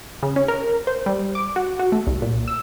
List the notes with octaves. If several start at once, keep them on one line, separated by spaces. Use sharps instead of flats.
C#3
C#4
A#4
C5
G3
D6
F#4
F#4
A3
C2
A#2
E6